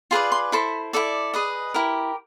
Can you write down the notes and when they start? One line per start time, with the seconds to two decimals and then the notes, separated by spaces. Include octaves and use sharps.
0.11 F4 G#4 B4 D5 C6
0.32 C6
0.52 E4 A4 C5 B5
0.93 E4 A4 D5
1.34 G#4 B4 D#5
1.74 E4 G4 A#4